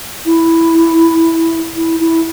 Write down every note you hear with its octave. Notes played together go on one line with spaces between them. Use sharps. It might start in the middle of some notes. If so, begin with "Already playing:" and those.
E4
E4
E4